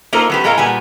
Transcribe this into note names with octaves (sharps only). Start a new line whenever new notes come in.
A#3 D#4 F4 A4 A#4 C5
F#3 B3 G4
A2 G#3 A4 A#4 F5 A#5
A#2 G3 B3 G#5